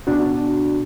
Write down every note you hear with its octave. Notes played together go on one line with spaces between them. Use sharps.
B2 D4 F#4